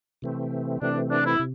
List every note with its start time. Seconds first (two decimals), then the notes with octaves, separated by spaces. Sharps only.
0.22 C3 E3 A3 C4
0.81 C3 E3 A3 C4 D4
1.10 D4
1.25 E4
1.39 C3